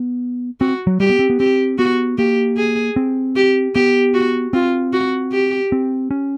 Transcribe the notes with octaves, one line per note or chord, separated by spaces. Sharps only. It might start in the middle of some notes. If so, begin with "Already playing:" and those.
Already playing: B3
C4 F#4
F#3
G3 G4
B3
C4
B3
C4 G4
B3 F#4
A#3 G4
G#4
C4
G4
B3 G4
F#4
C4 F4
F#4
G4
C4
C#4